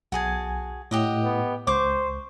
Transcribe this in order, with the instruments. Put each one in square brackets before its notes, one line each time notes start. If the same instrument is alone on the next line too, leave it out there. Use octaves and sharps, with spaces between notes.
[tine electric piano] B1 G#5 G#6 [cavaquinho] F#4 G#4 A5
[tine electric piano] A2 [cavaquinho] G4 D#5 F#5
[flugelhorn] B3
[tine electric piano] C#2 [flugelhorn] C5 [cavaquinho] C#6 D6